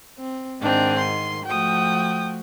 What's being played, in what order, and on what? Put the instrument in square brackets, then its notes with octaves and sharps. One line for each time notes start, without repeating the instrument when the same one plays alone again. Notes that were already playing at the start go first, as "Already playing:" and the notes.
[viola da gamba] C4
[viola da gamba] G#2 D#3 [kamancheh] C4 D4
[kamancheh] C6
[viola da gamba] F3 A3 F#4 [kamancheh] G5 D#6